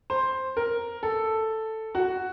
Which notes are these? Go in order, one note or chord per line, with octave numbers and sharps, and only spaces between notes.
C5
A#4
A4
F#4